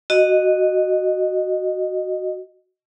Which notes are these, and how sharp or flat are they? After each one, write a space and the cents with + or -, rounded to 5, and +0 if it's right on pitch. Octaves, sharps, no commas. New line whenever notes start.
F#4 +0 D#5 -10